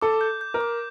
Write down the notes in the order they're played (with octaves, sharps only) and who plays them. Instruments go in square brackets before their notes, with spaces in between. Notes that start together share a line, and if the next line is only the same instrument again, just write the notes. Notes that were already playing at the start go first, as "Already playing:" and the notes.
[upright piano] A4 [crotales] D6
[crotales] G6
G6
[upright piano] A#4
[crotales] D6